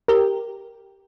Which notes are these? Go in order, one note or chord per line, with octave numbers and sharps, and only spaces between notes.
G4 A#4